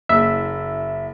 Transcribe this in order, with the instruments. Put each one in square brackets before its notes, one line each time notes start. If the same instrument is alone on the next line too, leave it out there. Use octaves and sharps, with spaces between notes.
[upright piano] F#1 [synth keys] E5